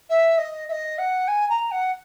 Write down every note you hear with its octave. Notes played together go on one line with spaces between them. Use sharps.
E5
D#5
E5
D#5
F#5
G#5
A#5
F#5